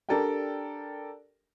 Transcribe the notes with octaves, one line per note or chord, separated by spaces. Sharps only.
D4 G4 A4 A#4 D5 G5